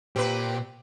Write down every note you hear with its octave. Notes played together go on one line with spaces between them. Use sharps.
A#2 C4 G4 B4